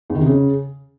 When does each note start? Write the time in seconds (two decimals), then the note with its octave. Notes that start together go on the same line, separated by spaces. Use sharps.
0.10 E2
0.15 D#3
0.21 C3
0.26 C#3